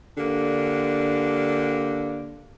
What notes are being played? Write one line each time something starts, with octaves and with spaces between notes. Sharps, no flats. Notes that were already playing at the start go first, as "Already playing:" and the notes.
D3 A#3 D4 G4